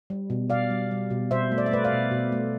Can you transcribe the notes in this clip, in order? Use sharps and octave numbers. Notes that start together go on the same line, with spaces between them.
G3
B2
B2 D5 F5
G3
G3
B2
B2 C5 E5
A3
D5
E5
A3 B4 D5
D5 F5
B2
B2
A3